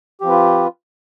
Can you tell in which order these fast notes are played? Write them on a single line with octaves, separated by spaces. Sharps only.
G4 F3 C4 B4 F4